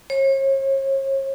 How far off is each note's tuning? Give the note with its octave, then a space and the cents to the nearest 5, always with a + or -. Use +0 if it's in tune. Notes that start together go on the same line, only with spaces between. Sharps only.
C#5 -40